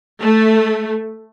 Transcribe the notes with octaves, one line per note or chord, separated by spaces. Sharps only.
A3